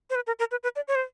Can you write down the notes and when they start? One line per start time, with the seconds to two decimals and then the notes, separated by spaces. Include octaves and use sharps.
0.10 C5
0.15 B4
0.27 A#4
0.39 A#4
0.51 B4
0.63 B4
0.76 D5
0.88 C#5
0.95 C5